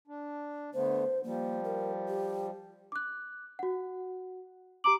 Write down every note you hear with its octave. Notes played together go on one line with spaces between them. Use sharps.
D4
D3 A3 B3 C5
F3 G3 A#3
A#4
G4
D6 F#6
F#4 F#5
G4 A#5 D6 F#7